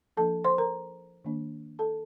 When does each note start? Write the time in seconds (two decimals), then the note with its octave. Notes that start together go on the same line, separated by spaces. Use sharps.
0.17 F3 A#3 D4 A4 A5
0.44 C5 C6
0.58 A#4 A#5
1.25 D#3 A#3 D4
1.79 A4 A5